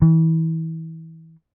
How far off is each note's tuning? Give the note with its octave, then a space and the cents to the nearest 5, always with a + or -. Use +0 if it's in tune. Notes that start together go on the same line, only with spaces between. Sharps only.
E3 -30